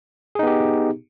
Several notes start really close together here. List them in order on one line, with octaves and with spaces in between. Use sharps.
G#4 D#4 B3 G4